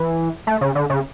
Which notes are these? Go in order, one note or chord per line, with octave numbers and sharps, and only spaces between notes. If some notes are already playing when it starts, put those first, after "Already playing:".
Already playing: E3
A3
C#3
D3
C#3